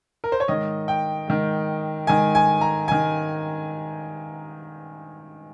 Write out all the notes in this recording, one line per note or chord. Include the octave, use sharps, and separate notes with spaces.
A#4
C5
C#5
G#2 D#3 D#5
G5
G#2 D#3
G#2 D#3 G#5
G#5
A#5
D#3 G#5